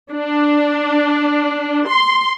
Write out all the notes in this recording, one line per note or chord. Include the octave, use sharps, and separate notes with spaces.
D4
C6